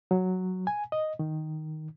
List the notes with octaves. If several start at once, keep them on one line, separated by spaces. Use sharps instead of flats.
F#3
G#5
D#5
D#3